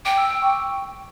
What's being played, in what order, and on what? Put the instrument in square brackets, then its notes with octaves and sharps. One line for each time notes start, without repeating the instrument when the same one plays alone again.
[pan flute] G5 [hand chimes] D6
[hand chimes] E6
E6
C#6